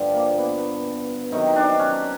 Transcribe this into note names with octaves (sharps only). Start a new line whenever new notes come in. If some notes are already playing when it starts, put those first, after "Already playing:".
Already playing: G2 D3 F3
A#3
B3
C3 D#3 F#3 D#4
D4
C#4